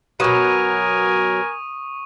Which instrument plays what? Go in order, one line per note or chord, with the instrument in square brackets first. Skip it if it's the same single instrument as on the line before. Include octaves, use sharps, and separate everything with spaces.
[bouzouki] B2 F#3 [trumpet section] A#4 G#5 [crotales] C#6 D#6 D#7